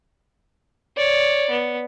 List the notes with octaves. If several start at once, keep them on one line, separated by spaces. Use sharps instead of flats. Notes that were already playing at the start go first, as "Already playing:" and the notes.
C#5 D5
B3